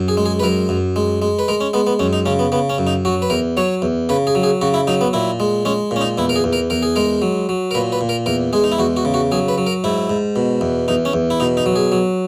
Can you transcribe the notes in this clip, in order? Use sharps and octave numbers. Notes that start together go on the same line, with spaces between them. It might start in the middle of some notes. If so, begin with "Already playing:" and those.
Already playing: F#2
G#4
G#3
G#4
B4
F#2 A#4
F#2
G#3
G#3
B4
G#3 A#4
C#4
G#3 B3
B3
F#2 C#4
D#4
C#3 C#4
B3
C#3 B3
C#4
F#2
D#4
F#3 F#4
B4
E2 A#4
F#3 C#5
E2
C#3 B4
G#4
F#3
G#4
C#3 F#4
E4
F#3 D#4
B3
A#2 E4
G#3
G#3 C#4
A#2 C#4
D#4
E2 E4
A#4
G#4
E2
A#4
E2 A#4
G#4
G#3 A#4
F#3
F#3
A#4
A#2 B4
B4
A#2
A#4
E2 A#4
G#3 G#4
D#4
E4
E2 F#4
F#4
C#3
F#4
F#3 G#4
B4
F#3
A#4
G#2 E4
G#2
B2
E2
E2 D#4
C#4
E2
E4
B2 D#4
D#4
F#3
G#4
F#3